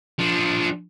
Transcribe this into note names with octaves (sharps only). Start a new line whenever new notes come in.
F3 D4